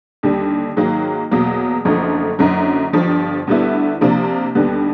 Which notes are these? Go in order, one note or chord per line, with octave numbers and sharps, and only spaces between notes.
D#2 D3 G3
G#2 D#3 F#3 A#3
E2 B2 F#3 A#3
F#1 F#2 D3 F3 A3
F#1 F#2 D3 F#3
G1 G2 D3 F3
D2 D3 G3 B3 E4
C3 F3 A#3 D4
D#2 D3 G3 B3